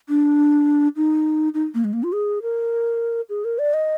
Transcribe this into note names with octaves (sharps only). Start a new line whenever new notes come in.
D4
D#4
D#4
A#3
G#3
A#3
F4
G#4
A#4
G#4
A#4
D5
D#5